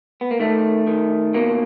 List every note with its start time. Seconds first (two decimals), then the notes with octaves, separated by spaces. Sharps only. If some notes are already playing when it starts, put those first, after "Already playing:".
0.21 B3
0.31 A#3
0.40 D#3 A3
0.87 D#3
1.34 B2 A#3